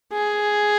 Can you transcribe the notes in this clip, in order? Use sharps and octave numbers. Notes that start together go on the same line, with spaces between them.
G#4